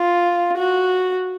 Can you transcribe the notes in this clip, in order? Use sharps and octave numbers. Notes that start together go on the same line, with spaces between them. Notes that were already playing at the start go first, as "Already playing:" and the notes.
Already playing: F4
F#4